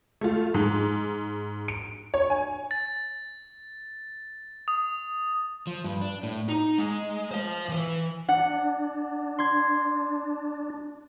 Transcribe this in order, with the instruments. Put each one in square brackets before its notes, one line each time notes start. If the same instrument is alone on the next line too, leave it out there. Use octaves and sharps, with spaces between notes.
[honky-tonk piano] A3 F4
G#2
D7
C#5
G#5
[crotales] A6
D#6
[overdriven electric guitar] F3
G2
D4
A2
[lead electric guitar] D#4
G#3
C5 F5
E3 B4
[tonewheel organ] D4 [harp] F#5
[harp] C6 G#6